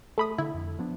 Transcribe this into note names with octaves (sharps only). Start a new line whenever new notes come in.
A3 B5 D#6
D3 E4
F2
F3 B3 D4